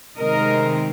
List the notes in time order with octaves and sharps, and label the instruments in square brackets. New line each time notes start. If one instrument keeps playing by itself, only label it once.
[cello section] C3 D#3 G#3 C4 A#4 D#5